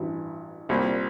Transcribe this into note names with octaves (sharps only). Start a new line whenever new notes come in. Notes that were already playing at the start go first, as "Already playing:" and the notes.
Already playing: A1 G2 E3
C2 A#2 G3